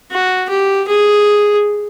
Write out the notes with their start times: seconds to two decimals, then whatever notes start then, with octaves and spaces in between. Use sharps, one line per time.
0.12 F#4
0.50 G4
0.88 G#4